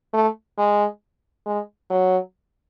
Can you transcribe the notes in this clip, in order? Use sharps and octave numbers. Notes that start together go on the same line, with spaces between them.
A3
G#3
G#3
F#3